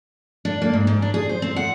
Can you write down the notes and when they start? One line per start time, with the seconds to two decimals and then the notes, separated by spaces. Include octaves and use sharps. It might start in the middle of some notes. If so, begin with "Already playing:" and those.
0.45 D4
0.62 A#3
0.73 G#2
0.87 G#2
1.02 D4
1.14 G#4
1.29 C5
1.42 C4
1.56 F#5